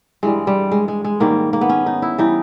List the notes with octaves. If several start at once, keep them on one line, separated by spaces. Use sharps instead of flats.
G2 E3 G3 G#3
G3
G#3
G#3
G#3
G#2 D#3 G3 A#3
A#3
B3
C#4
D#4
E4
E3 G3 D#4